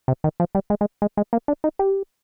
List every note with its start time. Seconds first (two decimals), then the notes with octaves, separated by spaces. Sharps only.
0.08 C3
0.24 D#3
0.40 F3
0.55 G3
0.70 G#3
0.81 G#3
1.02 G#3
1.17 G#3
1.33 A#3
1.48 D4
1.64 D#4
1.79 G4